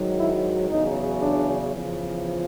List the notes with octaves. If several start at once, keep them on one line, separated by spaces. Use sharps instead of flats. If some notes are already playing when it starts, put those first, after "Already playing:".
Already playing: G#2 D#3 F#3
E4
E2 C#3 F#3 D#4
D4
E2 C#3 F3